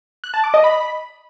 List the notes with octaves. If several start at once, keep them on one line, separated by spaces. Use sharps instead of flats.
F#6
A5
D6
D#5
B5